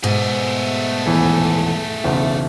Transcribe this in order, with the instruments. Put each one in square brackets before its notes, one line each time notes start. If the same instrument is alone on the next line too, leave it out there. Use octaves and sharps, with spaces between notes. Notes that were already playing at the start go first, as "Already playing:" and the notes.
[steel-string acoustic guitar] G#2 B2 [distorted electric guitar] A3 G#4
[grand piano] D#1 E2 E3
F#1 B1 E2